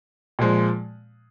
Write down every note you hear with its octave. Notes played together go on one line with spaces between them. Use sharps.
A#2 F3 G#3